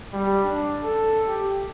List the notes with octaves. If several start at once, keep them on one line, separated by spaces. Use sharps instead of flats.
G3
D4
A4
G4